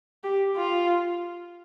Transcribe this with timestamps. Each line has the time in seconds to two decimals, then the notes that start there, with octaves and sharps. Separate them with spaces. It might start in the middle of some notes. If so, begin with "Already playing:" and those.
0.24 G4
0.56 F4